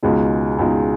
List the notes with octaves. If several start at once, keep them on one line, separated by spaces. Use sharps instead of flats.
C#2 B2 G#3 D#4
C#2 B2 G#3 D#4